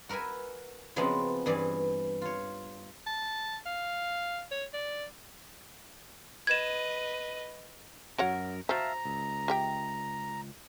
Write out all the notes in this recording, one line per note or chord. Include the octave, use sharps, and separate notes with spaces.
F#4 A#4 B4 E5 G#5
C#3 F3 F#3 G#3 B3 C4
G2 E3 G#4 D5
F4 C#5
A5
F5
C#5
D5
B4 D#5 G#6 E7
F#2 F#4 A#4 C#5 F#5
F#4 C5 E5 F5 A5 A#5
C#2
G4 E5 G5